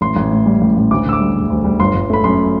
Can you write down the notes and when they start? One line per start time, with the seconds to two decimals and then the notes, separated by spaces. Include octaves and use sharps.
0.01 A1 C6
0.16 A1
0.32 A2
0.46 G3
0.61 A1
0.76 A1
0.91 D2 D6
1.05 D3 E6
1.13 D6
1.21 G3
1.35 E1
1.50 D2
1.64 G3
1.80 G1 C6
1.94 G1
2.10 A3 B5
2.24 F#2 C6